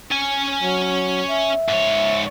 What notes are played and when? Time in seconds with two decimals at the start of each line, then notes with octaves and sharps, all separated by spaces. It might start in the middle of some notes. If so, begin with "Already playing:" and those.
0.11 C#4 G#5
0.62 F#3
1.30 E5
1.69 G#2 C#5